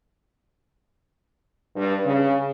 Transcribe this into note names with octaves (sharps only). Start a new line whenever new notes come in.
G2
C#3